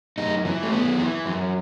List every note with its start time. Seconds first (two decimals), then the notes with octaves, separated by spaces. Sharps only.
0.18 F#2 D#4
0.45 E3
0.63 A3
0.72 F#2 B3
0.98 E3
1.25 F#2